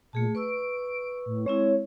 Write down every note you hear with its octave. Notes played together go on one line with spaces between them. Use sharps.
A#2 A3 G#4 A5
B4 C#6 E6 D7
A2
G#3 C4 E4 C#5